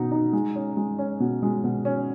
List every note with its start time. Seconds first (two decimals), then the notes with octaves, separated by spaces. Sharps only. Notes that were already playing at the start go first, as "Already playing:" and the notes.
Already playing: B2 D#4
0.11 D#4
0.33 G#3
0.55 C#4
0.77 G#3
0.99 C#4
1.20 B2
1.42 G#3
1.64 B2
1.85 C#4